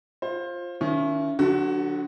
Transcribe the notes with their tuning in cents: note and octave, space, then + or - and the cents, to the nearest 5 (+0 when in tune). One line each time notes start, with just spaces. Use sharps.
F4 +0 C5 +25
D#3 +0 C#4 +35 E4 +25
D3 +0 F#3 -40 F#4 +25